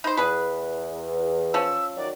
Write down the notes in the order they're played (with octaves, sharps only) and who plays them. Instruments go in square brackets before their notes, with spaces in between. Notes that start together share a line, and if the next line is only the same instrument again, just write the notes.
[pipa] D#4 C5 [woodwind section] B5
[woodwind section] E2 [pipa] G#4 B4
[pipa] F3 C#4 [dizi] E6
[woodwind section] D#3 F#3 [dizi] D5